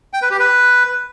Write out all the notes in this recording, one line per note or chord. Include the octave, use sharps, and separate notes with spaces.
G5
B4
G4
B4